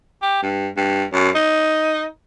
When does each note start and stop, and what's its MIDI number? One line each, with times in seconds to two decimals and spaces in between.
0.22 0.41 67
0.43 0.68 43
0.77 1.04 43
1.13 1.30 42
1.35 2.05 63